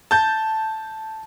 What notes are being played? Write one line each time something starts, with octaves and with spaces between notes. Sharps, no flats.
A5 G6